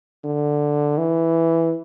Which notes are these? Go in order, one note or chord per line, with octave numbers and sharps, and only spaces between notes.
D3
E3